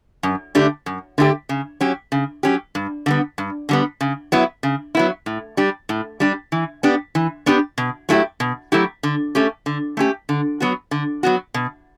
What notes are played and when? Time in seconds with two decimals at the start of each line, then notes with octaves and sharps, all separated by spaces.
0.23 F#2
0.55 D3 A3 D4 G4
0.86 F#2
1.18 D3 A3 D4 G4
1.49 C#3
1.81 F#3 C#4 G4
2.12 C#3
2.43 F#3 C#4 G4
2.75 G2
3.06 D3 G3 B3
3.38 G2
3.69 D3 G3 B3
4.01 C#3
4.32 F#3 B3 E4
4.63 C#3
4.95 F#3 B3 E4
5.26 A2
5.57 G3 D4 G4
5.89 A2
6.20 G3 D4 G4
6.52 E3
6.83 B3 D4 G4
7.15 E3
7.46 B3 D4 G4
7.78 B2
8.09 F#3 A3 E4 G4
8.40 B2
8.72 F#3 A3 E4 G4
9.03 D3
9.35 A3 C#4 G4
9.66 D3
9.97 A3 C#4 G4
10.29 D3
10.60 F#3 B3 F#4
10.91 D3
11.23 F#3 B3 F#4
11.54 B2